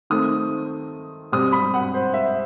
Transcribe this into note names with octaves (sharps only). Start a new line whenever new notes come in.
D#3 A3 C4 D#6
B2 G3 C4 D#6
B5
F#5
C5
E5